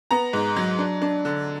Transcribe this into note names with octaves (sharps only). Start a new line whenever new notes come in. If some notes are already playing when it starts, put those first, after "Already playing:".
B3 A#5
G#2
F#3
D4
D4
D3